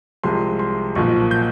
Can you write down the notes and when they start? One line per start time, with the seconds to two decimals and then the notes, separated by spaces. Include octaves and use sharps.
0.23 C2 C3 F3 G#3 C6
0.59 C6
0.95 B1 A#2 F3 C#6
1.31 G6